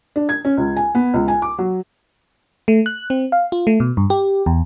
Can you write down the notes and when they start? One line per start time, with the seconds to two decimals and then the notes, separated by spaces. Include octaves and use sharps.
0.16 D4
0.29 G#6
0.45 C#4
0.57 C#2
0.77 G#5
0.95 B3
1.14 C#2
1.28 G#5
1.42 D6
1.58 F#3
2.68 A3
2.86 F#6
3.10 C4
3.32 F5
3.52 F4
3.67 A3
3.80 B2
3.97 G2
4.10 G4
4.46 E2